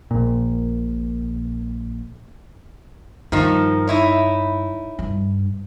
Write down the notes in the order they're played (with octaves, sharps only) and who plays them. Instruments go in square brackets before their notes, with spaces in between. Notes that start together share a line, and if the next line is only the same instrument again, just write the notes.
[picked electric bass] A#1 A#2
[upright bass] G2 [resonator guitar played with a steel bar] D#3 F3 D#4
[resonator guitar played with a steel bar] D#4 E4 C#5
[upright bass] G2